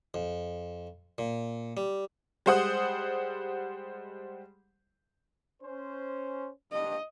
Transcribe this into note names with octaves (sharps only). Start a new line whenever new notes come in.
F2
A#2
G3
G3 G#3 C5 F#5 D#6
C#4 C5
G2 D#5